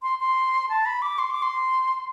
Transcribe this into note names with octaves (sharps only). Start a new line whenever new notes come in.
C6
C6
A5
B5
D6
C6
D6
C6